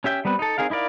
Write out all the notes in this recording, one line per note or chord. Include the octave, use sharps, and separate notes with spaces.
C#4 G4 E5 G5
G3 B3 C4 B4
D#4 A4
C4 D#4 G#4 A#4 F5
D#4 E4 A#4 D5 F5